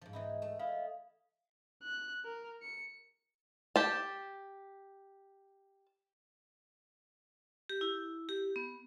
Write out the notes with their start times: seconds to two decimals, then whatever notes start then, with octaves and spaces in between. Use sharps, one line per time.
0.01 G#2 F3
0.13 E3 D#4 E4
0.42 A3
0.59 E4 D#5 F5
1.83 F#6
2.24 A#4
2.62 C#7
3.76 G4 A5
7.69 G4
7.81 E4
8.29 G4
8.56 B3